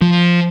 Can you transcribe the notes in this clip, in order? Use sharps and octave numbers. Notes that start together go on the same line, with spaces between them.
F3